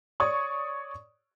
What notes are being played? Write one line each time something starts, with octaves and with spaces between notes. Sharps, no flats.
C#5 D5 C#6 D#6